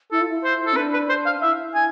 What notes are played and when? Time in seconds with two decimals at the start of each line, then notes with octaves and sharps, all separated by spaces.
0.12 E4 A4
0.21 F4
0.30 E4
0.44 C5
0.66 A4
0.73 C4
0.77 D4 B4
0.94 B4
1.09 C5
1.26 F5
1.42 E4 E5
1.75 G#5